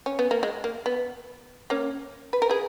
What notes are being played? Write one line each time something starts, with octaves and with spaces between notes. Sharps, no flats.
C#4
B3
A#3
G#3
A#3
B3
A#3 C#4
B4
A#4
G#4 B4